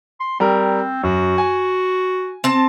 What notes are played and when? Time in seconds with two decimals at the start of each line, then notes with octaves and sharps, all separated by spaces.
0.20 C6
0.40 G3 C4 A#4
1.03 F#2 F#4
1.38 G#5
2.44 C4 A5